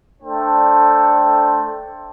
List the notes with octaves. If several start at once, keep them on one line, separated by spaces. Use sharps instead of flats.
A3 D4 A4 C5 G5